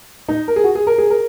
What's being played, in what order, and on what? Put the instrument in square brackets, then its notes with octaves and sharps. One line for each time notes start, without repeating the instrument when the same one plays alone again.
[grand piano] D#4
A#4
G#4
F#4
G#4
A#4
G#4
A#4